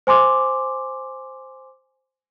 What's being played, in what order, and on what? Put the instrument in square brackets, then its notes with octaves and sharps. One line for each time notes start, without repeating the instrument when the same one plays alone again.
[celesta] C5 G#5 C6 D6